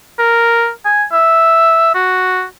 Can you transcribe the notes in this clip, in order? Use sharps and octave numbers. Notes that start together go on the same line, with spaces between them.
A#4
G#5
E5
F#4